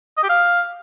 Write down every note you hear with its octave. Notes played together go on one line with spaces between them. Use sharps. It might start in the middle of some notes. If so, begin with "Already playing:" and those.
D#5
G4
F5